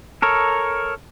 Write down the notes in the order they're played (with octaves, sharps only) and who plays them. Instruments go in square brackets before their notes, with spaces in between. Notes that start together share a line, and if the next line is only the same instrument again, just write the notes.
[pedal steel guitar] A4 A#4 C#5